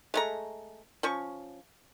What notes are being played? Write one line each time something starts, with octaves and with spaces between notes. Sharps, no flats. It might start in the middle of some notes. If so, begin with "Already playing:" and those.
G#3 A3 A#5
F3 C#4 C#6